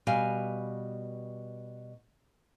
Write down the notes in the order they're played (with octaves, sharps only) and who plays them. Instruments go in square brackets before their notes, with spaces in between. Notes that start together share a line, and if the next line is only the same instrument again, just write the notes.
[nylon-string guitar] B2 G3 F5 G#5